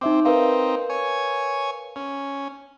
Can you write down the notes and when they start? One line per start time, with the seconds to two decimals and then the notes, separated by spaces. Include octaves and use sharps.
0.01 C4 D#4 E5 D6
0.25 C4 D#4 A#4 B4 F5
0.90 C#5 G#5
1.96 C#4